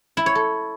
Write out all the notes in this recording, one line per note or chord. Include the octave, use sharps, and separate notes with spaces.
E4
C#5
A4